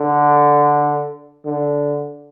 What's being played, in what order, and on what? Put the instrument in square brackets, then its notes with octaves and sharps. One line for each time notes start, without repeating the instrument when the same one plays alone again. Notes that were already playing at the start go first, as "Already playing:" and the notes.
Already playing: [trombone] D3
D3